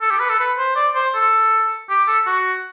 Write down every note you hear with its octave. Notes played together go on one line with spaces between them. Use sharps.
A4
G4
B4
A4
B4
C5
D5
C5
A4
G4
A4
F#4